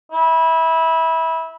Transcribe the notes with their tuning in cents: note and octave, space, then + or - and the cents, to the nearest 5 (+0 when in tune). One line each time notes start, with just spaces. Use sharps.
E4 -20